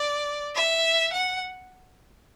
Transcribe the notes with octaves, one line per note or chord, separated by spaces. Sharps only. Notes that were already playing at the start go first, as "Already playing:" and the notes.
Already playing: D5
E5
F#5